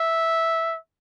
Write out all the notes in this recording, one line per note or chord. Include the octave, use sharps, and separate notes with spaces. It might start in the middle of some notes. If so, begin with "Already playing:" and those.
Already playing: E5